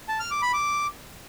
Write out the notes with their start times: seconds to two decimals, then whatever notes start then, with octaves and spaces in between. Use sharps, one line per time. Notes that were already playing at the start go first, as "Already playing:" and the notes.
0.08 A5
0.20 F6
0.31 D6
0.42 B5
0.53 D6